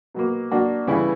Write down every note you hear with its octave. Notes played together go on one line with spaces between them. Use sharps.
B2 F#3 A#3
F#3 A#3 D4 F#4
C#3 E3 G3 B3 E4